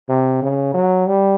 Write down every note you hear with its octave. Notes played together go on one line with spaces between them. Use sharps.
C3
C#3
F#3
G3